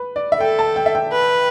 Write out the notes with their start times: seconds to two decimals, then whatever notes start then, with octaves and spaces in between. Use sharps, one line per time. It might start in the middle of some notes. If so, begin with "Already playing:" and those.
Already playing: B4
0.16 D5
0.32 E5
0.39 A4 G5
0.59 A5
0.76 G5
0.86 E5
0.95 G5
1.12 B4